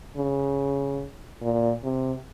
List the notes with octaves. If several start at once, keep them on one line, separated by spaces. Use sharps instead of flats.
C#3
A#2
C3